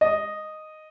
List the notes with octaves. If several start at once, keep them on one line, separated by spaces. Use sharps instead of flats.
D#5